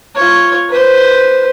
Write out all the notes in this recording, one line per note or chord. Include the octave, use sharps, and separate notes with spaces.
F4 C#5
B4 C5